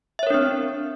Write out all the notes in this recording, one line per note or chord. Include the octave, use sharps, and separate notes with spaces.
C4 D4 A#4 C#5 E5